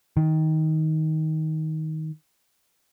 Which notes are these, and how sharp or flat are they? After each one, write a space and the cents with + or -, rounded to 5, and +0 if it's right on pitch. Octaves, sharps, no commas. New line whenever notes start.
D#3 +15